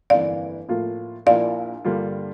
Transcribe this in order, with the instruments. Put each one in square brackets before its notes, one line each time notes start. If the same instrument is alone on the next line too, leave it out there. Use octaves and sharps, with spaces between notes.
[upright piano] G1 F2 E3 A#3 [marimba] D5 F5
[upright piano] A2 F3 A#3 F4
[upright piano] A#1 A#2 F3 A#3 E4 [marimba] D5 F5
[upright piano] G2 D3 G3 A#3 F4